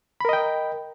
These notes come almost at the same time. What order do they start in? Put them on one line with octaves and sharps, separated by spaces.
B5 A#4 D#5 G5